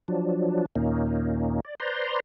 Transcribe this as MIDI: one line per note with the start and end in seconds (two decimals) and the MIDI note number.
0.08 0.66 53
0.08 0.66 54
0.08 0.66 62
0.76 1.60 39
0.76 1.60 46
0.76 1.60 58
0.76 1.60 61
0.76 1.60 63
1.65 1.75 74
1.80 2.20 71
1.80 2.20 72
1.80 2.20 74
1.80 2.20 82
1.80 2.20 84